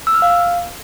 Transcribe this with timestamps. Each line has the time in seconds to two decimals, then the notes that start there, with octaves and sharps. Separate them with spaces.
0.07 E6
0.15 F6
0.22 F5